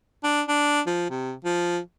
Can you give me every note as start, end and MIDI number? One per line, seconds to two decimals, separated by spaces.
0.24 0.42 62
0.48 0.81 62
0.87 1.08 53
1.10 1.33 48
1.45 1.79 53